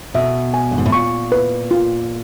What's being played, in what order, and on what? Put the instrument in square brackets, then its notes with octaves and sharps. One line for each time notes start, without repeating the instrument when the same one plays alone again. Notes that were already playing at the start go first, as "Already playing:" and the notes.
[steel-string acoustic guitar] B2 [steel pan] E5
[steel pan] G#5
[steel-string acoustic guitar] G2
G#2
A2
[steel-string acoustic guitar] A#2 [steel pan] C#6
[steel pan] B4
F4